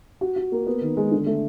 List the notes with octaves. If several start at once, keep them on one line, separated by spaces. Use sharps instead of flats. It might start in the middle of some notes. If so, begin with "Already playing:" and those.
F#4
F#4
A#3
B3
D#3
G#3
D3
A3